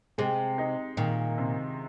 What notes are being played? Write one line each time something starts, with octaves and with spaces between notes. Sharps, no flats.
C3 G#3
D#4
A#2 D#3
C3